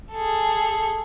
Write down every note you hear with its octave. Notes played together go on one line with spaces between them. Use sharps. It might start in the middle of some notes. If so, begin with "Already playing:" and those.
G#4 A4